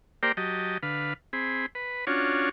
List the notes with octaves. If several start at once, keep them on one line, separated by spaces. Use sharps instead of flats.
A#3 G4 A#4 C5 D5 G5
F#3 G4 D#5 A5
D3 B4 F5
C4 G#4 B5
B4
C#4 D4 F4 F#4 C#5